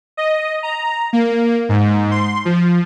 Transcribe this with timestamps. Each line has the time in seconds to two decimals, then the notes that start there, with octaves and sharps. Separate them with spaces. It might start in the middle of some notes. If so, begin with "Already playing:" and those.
0.17 D#5
0.63 A#5
1.13 A#3
1.69 G#2
2.11 C6
2.45 F3